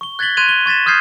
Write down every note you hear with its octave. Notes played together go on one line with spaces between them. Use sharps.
C#6 G7
F#6 G#6 A6 B6 F#7 G7
C6 F#6 G#6 D#7 F7
G7
C#6 G#6 A6 B6 E7
D#6 F6 G6 G#6 C7